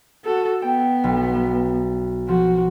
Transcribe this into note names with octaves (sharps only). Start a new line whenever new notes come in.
F#4 A4
B3 G5
B1
F3 F#4